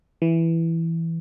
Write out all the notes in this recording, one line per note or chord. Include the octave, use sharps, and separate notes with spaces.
E3